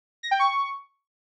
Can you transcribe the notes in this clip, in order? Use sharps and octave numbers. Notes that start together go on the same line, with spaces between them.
A#6
G5
C#6